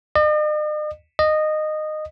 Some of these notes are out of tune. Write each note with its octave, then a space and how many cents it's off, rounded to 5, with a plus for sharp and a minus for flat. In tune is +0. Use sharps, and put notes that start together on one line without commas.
D#5 -45
D#5 -15